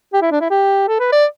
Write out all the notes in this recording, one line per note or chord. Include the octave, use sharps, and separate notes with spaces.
G4
E4
D4
E4
G4
A4
B4
D5